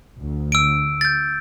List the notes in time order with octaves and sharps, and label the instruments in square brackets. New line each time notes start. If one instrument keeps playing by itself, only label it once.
[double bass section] D2
[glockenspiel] E6 D7
G6 A6